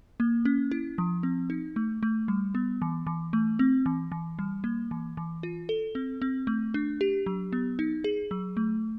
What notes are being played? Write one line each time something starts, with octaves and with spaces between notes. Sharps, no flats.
A#3
C#4
E4
F3
C4
D#4
A3
A3
G3
B3
E3
E3
A3
C4
E3
E3
G3
A#3
E3
E3
F4
A4
C4
C4
A3
D4
G4
F#3
B3
D#4
G#4
F#3
A3